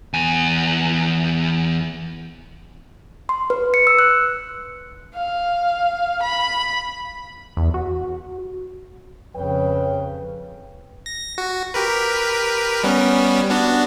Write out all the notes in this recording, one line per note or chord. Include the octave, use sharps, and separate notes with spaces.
E2 G#5
C6
B4
C#7
E6
F#6
F5
B5
E2
F#4
F2 C#3 B4 C#5 G5
A#6
F#4
G4 A#4 B4
G3 B3 C#4
B3 D4 F#4